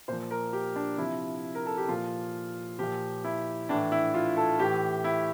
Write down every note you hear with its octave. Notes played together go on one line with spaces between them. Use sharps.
A#2 F3 C5
A#4
G4
D4
C3 F3 E4
A#4
A4
G4
A#2 F3 F4
A#2 F3 G4
E4
A2 E3 D4
E4
F4
A4
A2 E3 G4
E4